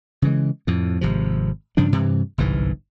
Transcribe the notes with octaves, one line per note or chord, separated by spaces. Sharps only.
C#3 E3 G#3
F2 A2
G#1 C3 F3
G2 C#3 F3 D4
G2 C3 E3
G1 C2 G#2 E3